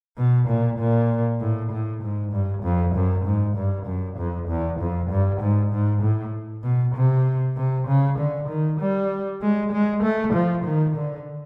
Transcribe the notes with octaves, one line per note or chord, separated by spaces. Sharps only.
B2
A#2
A#2
A2
A2
G#2
G2
F2
F#2
G#2
G2
F#2
F2
E2
F2
G2
G#2
G#2
A2
B2
C3
C3
C#3
D3
D#3
G3
G#3
G#3
A3
F3
D#3
D3